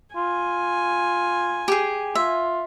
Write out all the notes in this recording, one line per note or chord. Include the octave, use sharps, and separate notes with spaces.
F4 G#5
G4 G#4
F4 E5